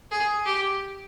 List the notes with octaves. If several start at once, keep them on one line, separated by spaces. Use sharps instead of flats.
G#4
G4